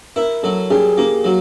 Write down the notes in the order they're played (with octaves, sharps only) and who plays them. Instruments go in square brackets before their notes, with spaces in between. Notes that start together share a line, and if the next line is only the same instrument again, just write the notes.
[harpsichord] E4 [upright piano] A#4
[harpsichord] F#3 [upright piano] A4
[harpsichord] G3 [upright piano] G#4
[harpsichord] A#3 [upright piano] G4
[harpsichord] F#3 [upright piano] F#4